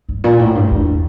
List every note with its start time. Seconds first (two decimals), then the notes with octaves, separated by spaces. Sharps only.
0.09 G2
0.24 A#2
0.39 A2
0.55 G2
0.71 E2